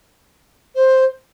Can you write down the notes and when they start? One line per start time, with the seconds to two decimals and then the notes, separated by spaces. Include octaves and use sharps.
0.75 C5